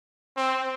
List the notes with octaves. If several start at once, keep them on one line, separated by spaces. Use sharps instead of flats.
C4